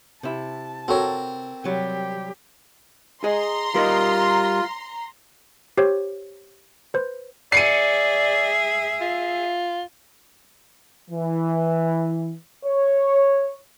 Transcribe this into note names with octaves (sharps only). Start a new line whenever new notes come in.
C3 E4 A5
C4 F#4 A4 A#4 C#5
C3 F#3 G3 G4
G#4 D#5 A#5 C6
G3 F4 A#4 D#5
G4 C5 C#5
B4 C5
G#4 D5 E5 C7 C#7 D#7
F4
E3
C#5